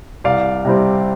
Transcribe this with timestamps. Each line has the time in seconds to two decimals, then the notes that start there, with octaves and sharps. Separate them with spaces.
0.24 C2 D5 F5
0.65 C3 G3 C4